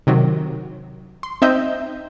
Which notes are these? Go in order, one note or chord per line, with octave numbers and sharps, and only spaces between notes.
C3 D#3 F#3
C6
C4 D#4 D#5 E5 G6